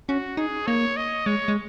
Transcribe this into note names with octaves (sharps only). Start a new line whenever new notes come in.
C#4 F#4
D#4 G#4
A#3 C#5
D#5
G#3 C#5
G#3